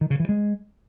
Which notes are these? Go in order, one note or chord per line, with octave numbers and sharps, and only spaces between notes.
D#3
C#3
E3
G#3